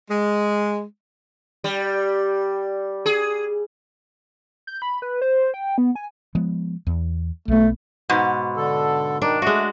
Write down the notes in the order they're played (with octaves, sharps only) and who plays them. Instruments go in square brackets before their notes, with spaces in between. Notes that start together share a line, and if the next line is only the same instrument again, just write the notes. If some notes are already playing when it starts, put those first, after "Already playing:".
[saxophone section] G#3
[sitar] G3
G#4
[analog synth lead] G6
B5
B4
C5
G5
B3
G#5
[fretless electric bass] F3 G#3 B3
E2
[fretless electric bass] B1 B3 [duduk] A3
[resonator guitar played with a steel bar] G#2 B2
[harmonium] D3 A4
[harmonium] D#3 D#4 [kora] D4
[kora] G#3 F#4 [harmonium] A3